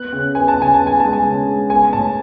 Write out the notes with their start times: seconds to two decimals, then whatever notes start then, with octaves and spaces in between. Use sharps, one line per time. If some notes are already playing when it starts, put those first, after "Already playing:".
Already playing: B3 F#6
0.12 C#3
0.35 B3 G#5
0.48 A5
0.58 C#3 G#5
0.74 A5
0.80 B3
0.87 G#5
1.00 G#3 A5
1.13 G#5
1.25 C#3
1.48 G#3
1.70 B3 G#5
1.93 A2 A5